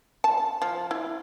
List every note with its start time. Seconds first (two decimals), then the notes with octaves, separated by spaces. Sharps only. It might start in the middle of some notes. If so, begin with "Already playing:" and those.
0.24 A5
0.62 F3
0.91 E4